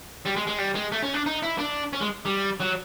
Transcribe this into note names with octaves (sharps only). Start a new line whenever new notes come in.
G3
G#3
G#3
G3
G#3
A3
C#4
D4
D#4
E4
D4
C#4
G#3
G3
F#3